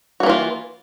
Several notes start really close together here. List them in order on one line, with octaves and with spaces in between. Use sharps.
F#4 A#3 E3 F4